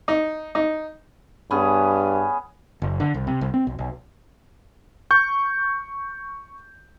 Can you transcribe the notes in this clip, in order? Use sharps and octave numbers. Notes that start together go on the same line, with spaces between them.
D#4
D#4
G2 B3 C#4 G#4
F#1
D3
C2
C3
C2
C4
B1
B1
C#6 G6